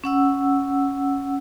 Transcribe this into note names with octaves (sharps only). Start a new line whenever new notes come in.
C#4 F#5 E6